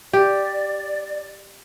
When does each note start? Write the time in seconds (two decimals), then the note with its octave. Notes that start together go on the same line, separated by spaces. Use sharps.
0.13 G4 D5